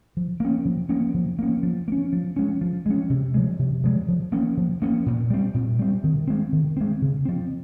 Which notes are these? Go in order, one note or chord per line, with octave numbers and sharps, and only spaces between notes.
F3
A#3 C#4
F3
A#3 C#4
F3
A#3 C#4
F3
A#3
C#4
F3
G#3 C#4
F3
G#3 C#4
C3
F3 G#3
C3
F3 G#3
F3
A#3 C#4
F3
A#3 C#4
A#2
G3 C4
A#2
G3 C4
D#3
G#3 C4
D#3
G#3 C4
C#3
F3 C4